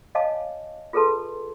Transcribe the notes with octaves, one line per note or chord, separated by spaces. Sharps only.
C#5 D#5 F5 G#5 A5 D6
F4 G#4 A4 B4 A5 C6